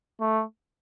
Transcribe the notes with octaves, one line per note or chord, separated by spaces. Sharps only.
A3